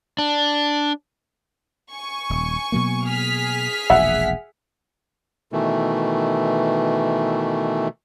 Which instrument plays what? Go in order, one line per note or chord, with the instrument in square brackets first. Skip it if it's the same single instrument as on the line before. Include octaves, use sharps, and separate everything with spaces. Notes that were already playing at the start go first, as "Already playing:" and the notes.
[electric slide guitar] D4
[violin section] G#5 C#6
[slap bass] D#1
B2 F#3 A#3
[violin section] G#4 F6 B6
[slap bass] E1 A#1 [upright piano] E5 F#5
[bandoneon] B2 D#3 E3 A3